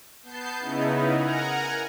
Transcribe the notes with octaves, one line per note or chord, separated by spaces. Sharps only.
B3 A5 G6 C7
C#3 B3 D#4 E4
A#4 F#5 G#5 A#5